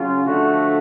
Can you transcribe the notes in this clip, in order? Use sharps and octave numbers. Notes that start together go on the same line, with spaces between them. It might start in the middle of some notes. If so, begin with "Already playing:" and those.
Already playing: C#3 F#3 C#4 F4
D3 F3 A3 D4 F#4